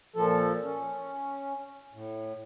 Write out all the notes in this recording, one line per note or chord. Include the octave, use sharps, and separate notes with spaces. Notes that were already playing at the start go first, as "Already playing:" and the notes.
A#2 F3 A4
C#4
A2